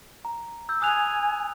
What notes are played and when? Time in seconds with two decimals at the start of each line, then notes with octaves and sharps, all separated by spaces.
0.25 A#5
0.69 E6 G6
0.82 G#5 D#6 F#6 F7